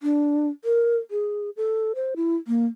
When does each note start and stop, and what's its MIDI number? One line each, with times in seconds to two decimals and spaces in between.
0.03 0.48 62
0.64 0.97 70
1.11 1.50 68
1.57 1.92 69
1.95 2.14 72
2.16 2.36 64
2.48 2.66 58